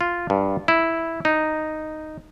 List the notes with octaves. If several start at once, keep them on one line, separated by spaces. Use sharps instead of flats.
F4
G2
E4
D#4